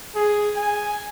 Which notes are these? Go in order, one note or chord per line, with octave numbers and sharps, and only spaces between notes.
G#4
G#5